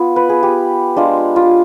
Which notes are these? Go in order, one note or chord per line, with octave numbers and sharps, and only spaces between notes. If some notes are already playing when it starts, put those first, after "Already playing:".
Already playing: B3 F4
B4
G#4
G4
G#3 D4 F4
F4